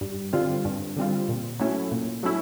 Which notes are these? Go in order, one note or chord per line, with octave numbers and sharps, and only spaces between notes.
G2
D3 G3 C4 F4
G2
D3 G3 C4 F4
A#2
F#3 A3 C#4 E4
A#2
F#3 A3 C#4 E4